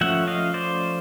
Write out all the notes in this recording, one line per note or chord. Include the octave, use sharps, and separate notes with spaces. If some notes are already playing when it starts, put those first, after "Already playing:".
F3 A3 C#4 E5 F#5
D#5 F5
C5 D5